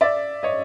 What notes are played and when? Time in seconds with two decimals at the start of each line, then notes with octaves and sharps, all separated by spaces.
0.01 D5 E5
0.43 C#5 D#5